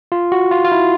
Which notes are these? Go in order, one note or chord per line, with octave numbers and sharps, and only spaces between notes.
F4
F#4
F4
F4
E4